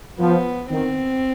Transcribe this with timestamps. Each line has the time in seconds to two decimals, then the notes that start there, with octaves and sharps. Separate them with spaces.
0.18 F3 B3
0.69 D#3 C4